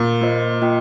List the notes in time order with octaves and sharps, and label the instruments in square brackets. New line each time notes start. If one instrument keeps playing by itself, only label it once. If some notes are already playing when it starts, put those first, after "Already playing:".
Already playing: [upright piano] A#2
[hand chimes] A#3 F4 C5 D#5
A#3 F4 D#5 G5